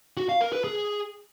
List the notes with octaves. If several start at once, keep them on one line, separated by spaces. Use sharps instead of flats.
F#4
F5
A#4
B4
G#4